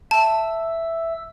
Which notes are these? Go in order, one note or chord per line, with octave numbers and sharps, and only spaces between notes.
E5 A5 E6